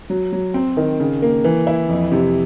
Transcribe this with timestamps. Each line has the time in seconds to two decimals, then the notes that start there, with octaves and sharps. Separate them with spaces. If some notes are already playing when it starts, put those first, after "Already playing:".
0.10 F#3
0.33 F#3
0.54 C4
0.77 D#3
1.00 C#3
1.22 A#3
1.44 E3
1.67 E4
1.89 F2
2.12 C3